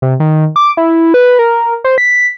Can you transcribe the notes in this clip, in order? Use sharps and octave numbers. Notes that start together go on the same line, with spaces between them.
C3
D#3
D6
E4
B4
A#4
C5
B6